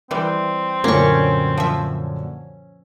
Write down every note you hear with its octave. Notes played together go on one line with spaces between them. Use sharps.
E3 G3 C4
F#2 A#2 D3 A#3 C#4 C#6
F3 E5